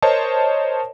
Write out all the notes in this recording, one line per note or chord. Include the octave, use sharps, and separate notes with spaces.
A#4 C5 C#5 D#5 A5